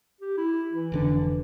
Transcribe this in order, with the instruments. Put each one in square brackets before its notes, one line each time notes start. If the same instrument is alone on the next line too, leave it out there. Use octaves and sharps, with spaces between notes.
[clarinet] G4
E4
E3
[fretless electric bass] F1 D3 D4